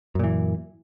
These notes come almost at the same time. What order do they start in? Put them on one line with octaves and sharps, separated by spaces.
F#2 A#2 E3